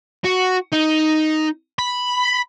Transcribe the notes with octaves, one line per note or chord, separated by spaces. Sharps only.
F#4
D#4
B5